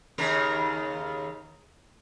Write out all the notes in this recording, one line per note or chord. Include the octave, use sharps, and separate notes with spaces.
D#2 C#3 A#4